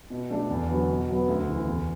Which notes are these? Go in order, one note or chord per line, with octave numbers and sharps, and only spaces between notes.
B2
A3 D4 A4
E2
D3 F#3 B3
B2
F#3 B3
D2
C#3 E3
E2